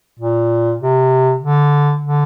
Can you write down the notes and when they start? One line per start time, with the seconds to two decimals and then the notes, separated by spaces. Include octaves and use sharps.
0.19 A#2
0.79 C3
1.40 D3
2.01 D3